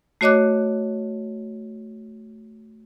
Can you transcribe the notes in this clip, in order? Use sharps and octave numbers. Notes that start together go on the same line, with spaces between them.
A3 F#4 C#5 D#5 D6 F#6